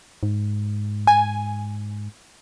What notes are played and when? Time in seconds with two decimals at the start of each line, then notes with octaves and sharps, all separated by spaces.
0.23 G#2
1.07 G#5